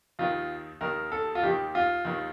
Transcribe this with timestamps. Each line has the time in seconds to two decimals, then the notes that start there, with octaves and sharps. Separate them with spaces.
0.19 D#2 D#3 F4
0.81 D#2 D#3 A#4
1.12 A4
1.35 F4
1.43 D#2 D#3 G4
1.75 F4
2.05 D#2 D#3